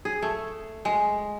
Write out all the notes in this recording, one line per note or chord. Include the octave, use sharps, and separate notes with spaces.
G#4
A3
G#3